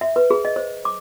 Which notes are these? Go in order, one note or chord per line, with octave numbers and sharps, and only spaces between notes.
E5
B4
G#4
D#5
C5
D6